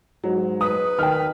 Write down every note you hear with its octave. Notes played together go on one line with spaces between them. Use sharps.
G#2 F#3
B4 D#6
D#3 G5 F6